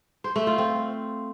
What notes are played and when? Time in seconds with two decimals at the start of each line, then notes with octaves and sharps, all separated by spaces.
0.24 C5
0.36 A3
0.47 F4
0.58 C4